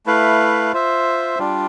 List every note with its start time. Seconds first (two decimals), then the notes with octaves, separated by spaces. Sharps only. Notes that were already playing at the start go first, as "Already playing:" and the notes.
0.06 A3 E4 B4 F5
0.73 F4 C5 E5
1.39 G3 D4 F4